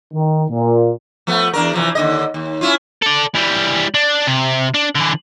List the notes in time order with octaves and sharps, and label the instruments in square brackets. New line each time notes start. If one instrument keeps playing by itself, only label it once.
[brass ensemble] D#3
A#2
[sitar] F3 A3 B3
E2 D4 A#4
C3 E3 F3
D#2 D3 D#5
D#2
C#4 E4 F4
[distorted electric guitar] A4 D5
E3 G3
D4
C3
D4
D3 E3